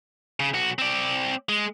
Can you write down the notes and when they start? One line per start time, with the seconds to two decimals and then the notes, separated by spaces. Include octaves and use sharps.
0.40 C#3
0.54 B1 F#4
0.79 C4 D5
1.49 G#3